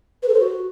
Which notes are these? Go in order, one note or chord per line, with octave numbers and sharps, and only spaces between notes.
B4
A4
C5
F#4